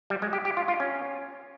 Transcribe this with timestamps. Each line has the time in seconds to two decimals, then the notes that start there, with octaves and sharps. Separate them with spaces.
0.10 G3
0.22 G#3
0.33 G4
0.45 G4
0.57 F4
0.68 F4
0.80 C#4